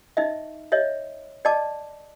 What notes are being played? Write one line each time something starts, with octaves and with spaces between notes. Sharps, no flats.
D#4 D#5 E5
C#5 D#5 E5
D5 D#5 A5 D6